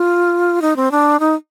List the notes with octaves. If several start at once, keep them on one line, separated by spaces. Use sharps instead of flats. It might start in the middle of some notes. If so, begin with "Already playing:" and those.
Already playing: F4
D#4
C4
D4
D#4